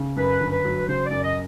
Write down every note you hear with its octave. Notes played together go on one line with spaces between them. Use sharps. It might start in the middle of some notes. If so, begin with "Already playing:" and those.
Already playing: C#3
F#2 B4
G1
B4
F#3
C#3 C5
F#2 D5
D#5